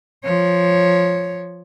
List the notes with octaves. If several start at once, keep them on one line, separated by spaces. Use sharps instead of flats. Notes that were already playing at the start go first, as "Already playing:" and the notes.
F3 C#5